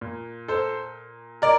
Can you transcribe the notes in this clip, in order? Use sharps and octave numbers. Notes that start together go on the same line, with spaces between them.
A#2
A4 C5
A#4 D5